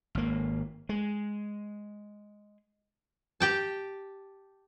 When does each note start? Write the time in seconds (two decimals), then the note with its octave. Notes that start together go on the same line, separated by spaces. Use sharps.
0.15 G#1 A#3
0.89 G#3
3.40 G4 G5 A5